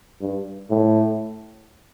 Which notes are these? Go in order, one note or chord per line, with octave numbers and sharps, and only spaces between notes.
G2
A2